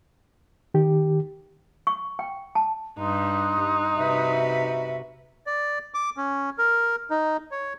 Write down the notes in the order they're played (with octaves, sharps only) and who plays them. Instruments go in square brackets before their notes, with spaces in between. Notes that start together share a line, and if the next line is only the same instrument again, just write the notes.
[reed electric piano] D#3 G4
[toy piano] C#6
G5
A5
[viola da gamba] G2 G3 [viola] D#4 [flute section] C6 D#6 F#6
[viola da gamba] C3 F#4 B4 [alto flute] E5
[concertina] D5
D6
C#4
A#4
D#4
C#5